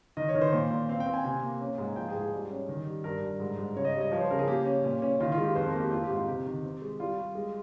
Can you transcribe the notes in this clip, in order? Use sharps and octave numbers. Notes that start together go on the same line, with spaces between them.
D#3 D#5
C#5
D#3
C5
A#2
A#2
C4 F5
G5
C4
G#5
C3 G#5
A#3
C#4
G#2
F3 G5
G#4
G#2
G#4
G3 G4
C#4
D#3
G3
G2 A#4
G2
G#2
G#2
C#3 C#5
D#5
C#5
G3
D#5
F3 C#5
C5
C#3 A#4
G#4
A#3 G4
C#4
A#2
C#4
D#3 F4
F4
G#3
G4
F2 C5
A#4
A#3
G4
C4 F4
G4
G#2
F4
C3 G4
D#3
C4
G#3
G3 F4
G3
G#3